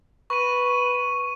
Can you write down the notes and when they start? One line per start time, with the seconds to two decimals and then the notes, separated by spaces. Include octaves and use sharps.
0.30 B4 C#6 D#7